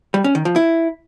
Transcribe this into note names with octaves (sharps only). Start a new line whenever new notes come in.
G3
C#4
D#3
F3
E4